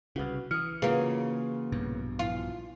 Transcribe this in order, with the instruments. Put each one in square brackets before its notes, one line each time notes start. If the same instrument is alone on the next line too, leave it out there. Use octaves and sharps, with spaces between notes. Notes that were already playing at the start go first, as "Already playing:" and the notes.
[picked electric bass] C2 C#3 [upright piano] F#4 B4
[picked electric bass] E3 [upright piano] D#6 C#7 [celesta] F6
[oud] C#3 A#3 [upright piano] F4 F#4 [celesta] G#4 B4
[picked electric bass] A#1 G2 B2
[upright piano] E3 F3 [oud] F4